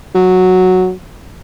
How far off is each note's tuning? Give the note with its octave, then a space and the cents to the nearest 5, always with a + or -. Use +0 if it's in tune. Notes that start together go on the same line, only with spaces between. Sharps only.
F#3 -5